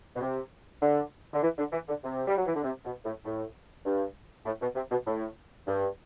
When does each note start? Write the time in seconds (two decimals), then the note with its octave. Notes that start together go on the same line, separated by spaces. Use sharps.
0.16 B2
0.21 C3
0.82 D3
1.34 D3
1.43 E3
1.58 D3
1.73 E3
1.88 D3
2.04 C3
2.28 G3
2.37 F#3
2.46 E3
2.55 D3
2.64 C3
2.85 B2
3.05 A2
3.25 A2
3.85 G2
4.46 A2
4.61 B2
4.76 C3
4.91 B2
5.07 A2
5.67 G2